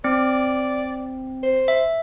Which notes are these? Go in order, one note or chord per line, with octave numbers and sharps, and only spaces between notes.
C4 D5
C5
E5